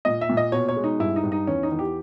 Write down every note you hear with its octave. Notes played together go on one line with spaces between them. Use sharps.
A#2 D#5
E5
A#2
D#5
B2 C#5
C#5
G#3
D#4
G2 E4
D#4
G2
D#4
E2 C#4
D#4
E2
G4